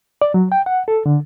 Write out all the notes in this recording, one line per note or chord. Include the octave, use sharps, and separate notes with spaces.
D5
F#3
G5
F#5
A4
D3